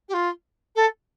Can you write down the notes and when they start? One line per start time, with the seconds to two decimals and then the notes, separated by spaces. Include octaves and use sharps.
0.09 G4
0.14 F4
0.76 A4